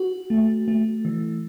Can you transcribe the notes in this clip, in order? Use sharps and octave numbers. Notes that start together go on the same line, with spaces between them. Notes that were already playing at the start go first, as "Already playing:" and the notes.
Already playing: F#4
A3
A3
E3